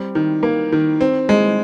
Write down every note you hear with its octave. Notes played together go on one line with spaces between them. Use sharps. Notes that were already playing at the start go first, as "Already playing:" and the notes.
Already playing: G3 C4
D#3
A#3
D#3
C4
G#3